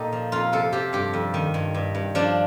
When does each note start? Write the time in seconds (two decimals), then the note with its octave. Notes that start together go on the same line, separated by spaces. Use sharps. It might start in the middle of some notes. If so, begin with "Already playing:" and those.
Already playing: A#2 D#4 G4 A4
0.12 F3
0.32 F2 F4
0.53 C3 A4
0.72 F3 G4
0.93 G2 G4
1.14 F2
1.34 D#3
1.54 G2
1.75 G2
1.95 G2
2.15 F3 D4